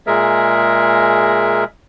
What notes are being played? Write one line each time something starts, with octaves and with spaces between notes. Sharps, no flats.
A#2 G#3 G#4 A#4 E5